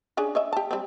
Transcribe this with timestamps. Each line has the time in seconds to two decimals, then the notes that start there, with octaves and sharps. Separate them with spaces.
0.17 C#4 D4 G#4
0.35 C#5 D#5 E5
0.53 G4 A5
0.71 G3 C4